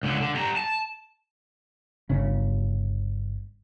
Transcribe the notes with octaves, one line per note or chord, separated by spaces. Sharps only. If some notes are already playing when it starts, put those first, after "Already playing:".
C#2 D3
D3
G3 A#5
A5
G1 C#3 C#4